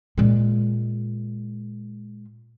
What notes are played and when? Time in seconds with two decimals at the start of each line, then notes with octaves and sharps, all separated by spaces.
0.18 A#2 G#3